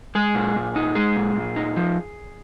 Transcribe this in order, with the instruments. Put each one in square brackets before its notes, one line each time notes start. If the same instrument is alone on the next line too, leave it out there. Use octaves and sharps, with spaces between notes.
[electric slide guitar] G#3 G#4
A#2
A#2
D#4
G#3 G#4
A#2
A#2
D#4
F3